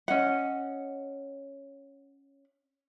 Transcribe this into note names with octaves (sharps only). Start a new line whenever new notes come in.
C#4 D#5 F#5